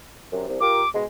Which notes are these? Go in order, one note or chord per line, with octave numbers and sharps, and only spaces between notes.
F#2 C3
C2
F4 G4 A#4 D6
B2 G#3